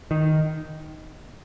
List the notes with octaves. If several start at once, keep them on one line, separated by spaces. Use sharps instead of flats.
D#3